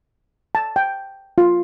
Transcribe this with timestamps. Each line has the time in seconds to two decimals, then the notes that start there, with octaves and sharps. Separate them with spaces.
0.55 A5
0.76 G5
1.38 F4